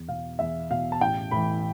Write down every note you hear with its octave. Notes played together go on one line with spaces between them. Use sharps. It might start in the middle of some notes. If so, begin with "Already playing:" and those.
Already playing: E2
B2 F5
E2 E5
B2 F5
A5
A1 G5
A2 E3 B5